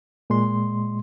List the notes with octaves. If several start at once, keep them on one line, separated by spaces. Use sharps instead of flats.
A#2 G#3 C6